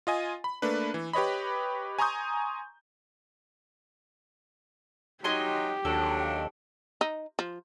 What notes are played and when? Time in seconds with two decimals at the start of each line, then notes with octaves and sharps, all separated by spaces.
0.07 F4 D#5 G#5
0.44 B5
0.62 A3 A#3 D4 B4
0.94 E3
1.13 G4 B4 C#5 D#5 B5
1.99 G#5 A#5 C6 C#6 D#6 G6
5.24 F#3 D#4 G4 D#5 G#5 C6
5.85 D#2 F#3 D4 A4
7.01 D#4
7.39 F3